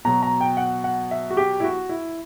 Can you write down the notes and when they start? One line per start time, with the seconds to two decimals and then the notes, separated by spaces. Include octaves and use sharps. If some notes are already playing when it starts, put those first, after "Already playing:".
0.05 B2 F#3 A#5
0.23 A#5
0.41 G5
0.57 F#5
0.84 F#5
1.11 E5
1.30 F#4
1.37 G4
1.60 E4
1.64 F#4
1.89 E4